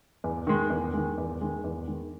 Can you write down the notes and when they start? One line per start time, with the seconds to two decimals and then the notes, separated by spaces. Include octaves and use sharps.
0.24 E2
0.47 D#3 G#3
0.70 E2
0.93 D#3 G#3
1.18 E2
1.41 D#3 G#3
1.64 E2
1.88 D#3 G#3